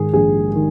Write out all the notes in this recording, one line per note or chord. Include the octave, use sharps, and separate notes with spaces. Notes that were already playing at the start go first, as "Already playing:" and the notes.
Already playing: G#2 D#3 G#4
A#1 G#4
D#3